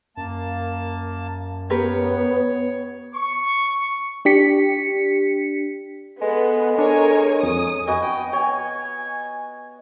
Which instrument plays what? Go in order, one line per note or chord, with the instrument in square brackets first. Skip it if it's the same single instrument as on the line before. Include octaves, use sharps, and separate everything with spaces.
[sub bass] F#2 [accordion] A#3 A5
[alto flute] B3 [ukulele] G4 A#4 B4 [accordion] C#5
[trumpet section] C#6
[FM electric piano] D4 G4 B6 C#7
[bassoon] G#3 [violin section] B3 [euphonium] A4
[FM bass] D4 [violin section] A#4 C#5 G#5
[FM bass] F2 [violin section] D#6
[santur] B3 F#4 D#5 [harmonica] G#5
[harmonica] G5
[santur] C#5 [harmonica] G#5